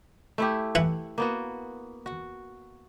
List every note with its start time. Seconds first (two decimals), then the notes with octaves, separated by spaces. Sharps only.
0.38 A3 E4 G4
0.75 E3 E5 F#5
1.18 A#3 B3 F#4
2.06 F#4